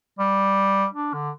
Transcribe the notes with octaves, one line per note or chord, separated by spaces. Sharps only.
G3
D4
D3